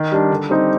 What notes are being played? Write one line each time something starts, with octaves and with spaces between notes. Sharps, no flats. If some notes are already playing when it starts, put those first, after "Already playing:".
Already playing: D#3
G3 D4
D3
G3 C4 D#4 G4